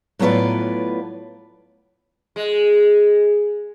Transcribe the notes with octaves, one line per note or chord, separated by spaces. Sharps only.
A2 F#3 B3 F4 B4 D5
G#3